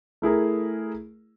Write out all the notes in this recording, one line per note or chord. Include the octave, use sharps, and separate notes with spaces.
A3 E4 G#4 A#4